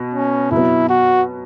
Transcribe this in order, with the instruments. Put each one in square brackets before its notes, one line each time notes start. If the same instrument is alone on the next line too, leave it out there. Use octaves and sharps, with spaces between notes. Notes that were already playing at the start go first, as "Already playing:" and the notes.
Already playing: [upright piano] B2
[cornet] C#4
[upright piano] B2 F#3 B3 [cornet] E4
[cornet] F#4